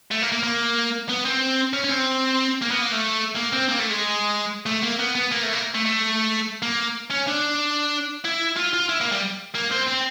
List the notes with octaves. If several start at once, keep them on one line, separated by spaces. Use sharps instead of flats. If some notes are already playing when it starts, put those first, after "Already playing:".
A3
A#3
A#3
A#3
B3
C4
C#4
C#4
C4
A#3
B3
A#3
A3
A#3
C4
A#3
A3
G#3
A3
A#3
B3
B3
A#3
A3
A#3
A3
A3
A#3
C#4
D4
E4
F4
F4
E4
A#3
G3
A#3
C4
C4